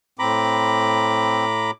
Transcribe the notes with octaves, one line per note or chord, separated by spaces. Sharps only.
A2 C4 A#5 B5 D6